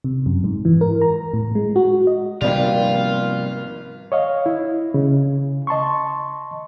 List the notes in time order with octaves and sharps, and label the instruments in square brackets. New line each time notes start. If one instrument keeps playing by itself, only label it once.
[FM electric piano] C3
F#2
G#2
E3
A#4
A#5
A2
G#3
F#4
D#5
[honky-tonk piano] G#1 B3 [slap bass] C3 F3 A#3 [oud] G3 [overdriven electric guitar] F4
[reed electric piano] C#5 D#5 F5
E4
C#3
D#5 A5 C6 C#6